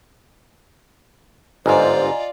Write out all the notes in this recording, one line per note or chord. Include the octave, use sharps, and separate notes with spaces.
G1 G#2 F4 C5 D5 D#5 G#5 A#5